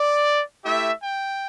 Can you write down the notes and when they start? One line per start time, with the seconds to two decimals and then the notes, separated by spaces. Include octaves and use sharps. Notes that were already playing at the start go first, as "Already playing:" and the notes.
Already playing: D5
0.64 A3 E4 G4 E5
1.02 G5